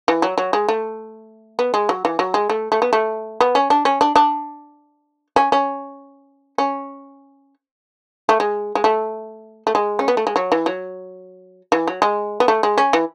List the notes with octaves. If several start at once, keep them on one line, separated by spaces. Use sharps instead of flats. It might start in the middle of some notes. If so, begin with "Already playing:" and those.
E3
F#3
F#3
G#3
A3
B3
G#3
F#3
E3
F#3
G#3
A3
A3
B3
A3
B3
C#4
D4
C#4
D4
D4
C#4
C#4
C#4
A3
G#3
G#3
A3
A3
G#3
C#4
B3
A3
G#3
F#3
E3
F#3
E3
F#3
G#3
B3
A3
G#3
C#4
E3